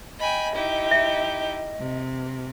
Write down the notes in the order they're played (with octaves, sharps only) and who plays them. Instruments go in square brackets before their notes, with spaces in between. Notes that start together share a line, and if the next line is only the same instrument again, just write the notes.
[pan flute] D#5 [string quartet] G5 G#5 B5
[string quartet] D#4 E4 G4
[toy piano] E5
[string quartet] C3